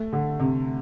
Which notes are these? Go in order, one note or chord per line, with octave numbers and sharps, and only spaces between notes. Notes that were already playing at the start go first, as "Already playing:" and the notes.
Already playing: A3
D3
C3